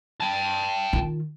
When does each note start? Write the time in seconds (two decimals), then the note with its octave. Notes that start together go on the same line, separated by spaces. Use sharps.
0.21 G5 A5
0.93 D#3 F4